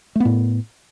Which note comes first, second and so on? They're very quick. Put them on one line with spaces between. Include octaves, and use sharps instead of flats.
A3 B3 A2